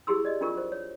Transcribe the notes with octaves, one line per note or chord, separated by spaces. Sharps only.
E4 G4 G#4 C6 E6
D5 D#5
D4 F4 A#4 C#6
C5
C#5